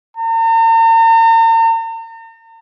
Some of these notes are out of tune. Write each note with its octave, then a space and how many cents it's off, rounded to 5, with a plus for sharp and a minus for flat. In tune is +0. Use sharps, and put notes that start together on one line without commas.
A#5 -45